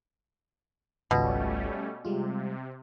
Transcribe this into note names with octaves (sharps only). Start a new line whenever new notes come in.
G#1 C#2 B2 G3 A3 C#4 F4
C3 G3 G#3 F4